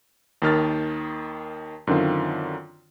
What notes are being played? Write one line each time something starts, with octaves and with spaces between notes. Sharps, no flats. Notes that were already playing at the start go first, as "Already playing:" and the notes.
D#2 D#3 F6 A6
F#2 D3 D#3 C4 F4